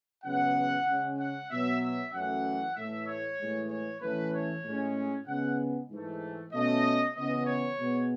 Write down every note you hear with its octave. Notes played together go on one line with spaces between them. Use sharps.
F#2 C#3 E3 G#3 B3 F#5
C#3 G#3 C#4
F#5
B2 F#3 B3 E5
E5
F#2 E3 A3 F#5
A2 E3 A3 E5
C#5
A2 E3 G#3
C#5
A2 E3 A3 C#4 B4
C#5
A2 G#3 C#4
C#3 G#3 B3 F#5
G#2 E3 A3
B2 A3 C#4 D#5
C#3 E3 B3 D#5
C#5
B2 G#3 B3